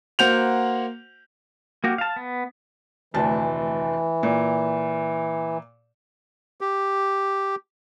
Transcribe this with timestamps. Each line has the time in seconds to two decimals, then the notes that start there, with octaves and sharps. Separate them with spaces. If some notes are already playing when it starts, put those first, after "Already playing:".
0.19 A#3 F#4 C5 F#5 G6 F7
1.84 A#3 F#4 G4
1.98 F5 A5
2.16 B3
3.14 F1 D2 E3 A5
4.23 A#2
6.61 G4